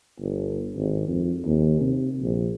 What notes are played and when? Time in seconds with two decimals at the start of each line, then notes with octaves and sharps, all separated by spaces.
0.20 G1
0.76 G#1
1.08 F2
1.46 D#2
1.81 C3
2.22 A#1